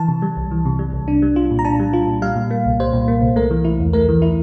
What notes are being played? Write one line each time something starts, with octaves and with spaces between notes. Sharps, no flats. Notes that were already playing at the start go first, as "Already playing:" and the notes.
Already playing: E3 A5
C3
G3
C2
E3
C3
G3
C2
D4
G3
F4
A#2
A#5
D4 A5
G3
F4
A#2
G3 F5
A#2
A#3
C2
G3 C5
A#2
A#3
C2
A3 A#4
E3
E4
E2
A3 A#4
E3
E4